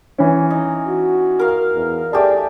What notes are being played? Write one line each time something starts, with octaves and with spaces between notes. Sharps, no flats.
E3 C#4
D#4
F#4
A#4 F5
E2
A3 G4 G#4 D5 A5